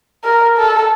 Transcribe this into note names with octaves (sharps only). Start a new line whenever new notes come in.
A#4
A4